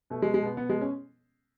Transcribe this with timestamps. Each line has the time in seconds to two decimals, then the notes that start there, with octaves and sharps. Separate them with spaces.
0.10 B2 A3
0.22 G#3
0.26 B2
0.34 G#3
0.42 B2 B3
0.57 B2 B3
0.69 B2 G#3
0.81 C#4